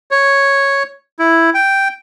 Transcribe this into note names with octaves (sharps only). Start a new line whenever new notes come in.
C#5
E4
G5